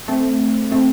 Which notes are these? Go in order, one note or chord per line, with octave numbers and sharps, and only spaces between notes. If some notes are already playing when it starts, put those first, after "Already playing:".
A3 C4
A3 C4